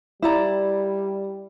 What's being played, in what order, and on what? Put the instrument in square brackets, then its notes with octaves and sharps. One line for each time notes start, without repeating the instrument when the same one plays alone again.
[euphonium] G3 [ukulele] E4 D5 A#5